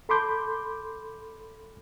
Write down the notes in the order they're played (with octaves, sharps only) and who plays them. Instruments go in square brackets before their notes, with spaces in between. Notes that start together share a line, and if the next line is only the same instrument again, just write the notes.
[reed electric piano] A4 B5 C6 D6 G6